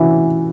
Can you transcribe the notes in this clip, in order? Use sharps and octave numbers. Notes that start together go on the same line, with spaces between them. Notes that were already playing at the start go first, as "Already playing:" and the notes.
Already playing: E3 C#4 F#4